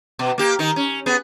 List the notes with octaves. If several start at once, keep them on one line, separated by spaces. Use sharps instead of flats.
B2
A#3 G4
D#3 D#4 A#4
C#4
B3 G#4